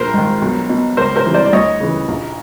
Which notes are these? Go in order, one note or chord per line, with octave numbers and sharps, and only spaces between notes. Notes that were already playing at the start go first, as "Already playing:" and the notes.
Already playing: A#1 A#4 C5
G#2 D#3
B1
B2
C#2 A#4 C5
A#4 C5
C3 E3
C5 D5
D5
D2 C#5 D#5
C#3 E3
A#1